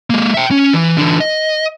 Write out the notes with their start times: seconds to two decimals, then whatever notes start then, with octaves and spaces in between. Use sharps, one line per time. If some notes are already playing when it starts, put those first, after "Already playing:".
0.10 G#3 A#3
0.34 E5 G5
0.51 C#4
0.73 E3
0.98 D3 E3
1.21 D#5